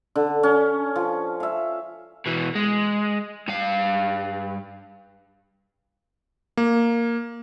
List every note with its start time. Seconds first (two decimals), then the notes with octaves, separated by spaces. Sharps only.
0.16 D3
0.43 C#4
0.96 F3
1.40 E5 F5
2.26 B2 E3
2.56 G#3
3.48 G2 F5
6.57 A#3